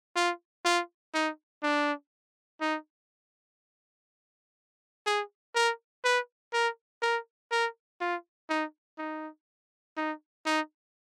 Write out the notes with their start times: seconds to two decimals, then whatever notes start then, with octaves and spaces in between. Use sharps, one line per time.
0.16 F4
0.65 F4
1.14 D#4
1.63 D4
2.61 D#4
5.06 G#4
5.55 A#4
6.04 B4
6.53 A#4
7.02 A#4
7.51 A#4
8.01 F4
8.50 D#4
8.98 D#4
9.97 D#4
10.46 D#4